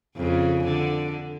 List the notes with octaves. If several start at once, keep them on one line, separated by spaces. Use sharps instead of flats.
F2 C#3
D3